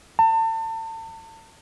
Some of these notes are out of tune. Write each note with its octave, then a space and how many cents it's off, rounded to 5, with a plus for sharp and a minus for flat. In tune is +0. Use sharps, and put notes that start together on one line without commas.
A5 +35